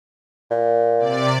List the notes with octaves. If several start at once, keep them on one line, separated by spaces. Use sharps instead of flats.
A#2
C3 D5